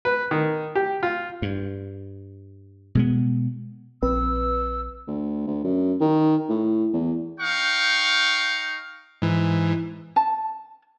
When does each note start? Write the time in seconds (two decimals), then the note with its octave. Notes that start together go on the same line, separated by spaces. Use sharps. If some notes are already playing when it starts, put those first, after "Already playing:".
0.05 B4
0.31 D#3
0.75 G4
1.03 F4
1.42 G2
2.95 B2 G#3 B3
4.03 A#1 C4 B4 E6
5.07 D2
5.47 D2
5.64 F#2
6.00 D#3
6.49 A2
6.93 E2
7.40 D#4 F5 G5 C#6
9.22 G#2 E3
10.16 A5